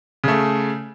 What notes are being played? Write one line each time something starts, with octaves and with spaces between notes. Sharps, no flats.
C#3 A3